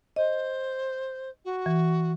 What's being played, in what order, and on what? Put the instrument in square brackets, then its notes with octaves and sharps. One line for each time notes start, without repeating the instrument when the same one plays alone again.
[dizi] C5 [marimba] D#5
[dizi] F#4
[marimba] E3